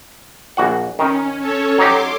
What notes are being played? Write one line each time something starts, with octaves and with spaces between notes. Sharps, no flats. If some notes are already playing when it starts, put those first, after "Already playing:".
A#1 F#4 F#5
D#3 C#4 D#4
C#4 A4 C#5
F#3 D#4 G4 C6 D6